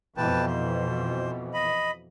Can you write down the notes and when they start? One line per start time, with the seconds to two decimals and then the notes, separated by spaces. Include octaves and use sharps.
0.17 F2 B2 E3 B4 G5 A5
0.47 C5
1.54 D#5 B5